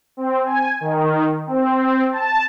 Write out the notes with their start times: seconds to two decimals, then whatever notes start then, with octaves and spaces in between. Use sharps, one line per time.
0.17 C4
0.45 G#5
0.81 D#3
1.46 C4
2.11 A5